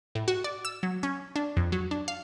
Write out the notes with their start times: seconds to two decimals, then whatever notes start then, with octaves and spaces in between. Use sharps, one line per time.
0.15 A2
0.28 F#4
0.44 D5
0.65 E6
0.83 F#3
1.03 C#4
1.36 D4
1.57 F2
1.72 F#3
1.91 D4
2.08 F5